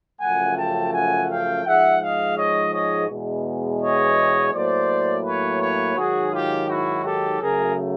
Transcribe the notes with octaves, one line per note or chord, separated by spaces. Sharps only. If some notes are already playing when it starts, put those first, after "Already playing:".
F#2 C#3 F3 A3 F#5 G#5
G5 A5
F#5 G#5
F5 G5
G#2 F3 G#3 E5 F#5
D#5 F5
C#5 D#5
C#5 D#5
E2 B2 G#3
C#5 D#5
A2 F#3 A#3 C5 D5
B4 C#5
B4 C#5
G#2 D#3 F#3 F#4 G#4
F4 G4
E4 F#4
G4 A4
F#2 C#3 F#3 A3 G#4 A#4